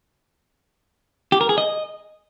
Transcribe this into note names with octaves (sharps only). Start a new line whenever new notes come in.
G4
A#4
G#4
D#5